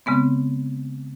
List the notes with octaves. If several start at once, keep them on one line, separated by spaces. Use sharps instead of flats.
C#3 G#3 B3 C4